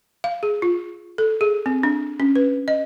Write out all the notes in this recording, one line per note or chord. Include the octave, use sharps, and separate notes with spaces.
F5
G#4
F4
A4
G#4
C4
D4
C#4
B4
D#5